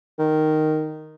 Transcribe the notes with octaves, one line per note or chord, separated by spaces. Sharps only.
D#3